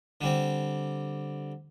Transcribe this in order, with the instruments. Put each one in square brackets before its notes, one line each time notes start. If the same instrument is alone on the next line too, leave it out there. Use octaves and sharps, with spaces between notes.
[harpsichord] D3 G3 C4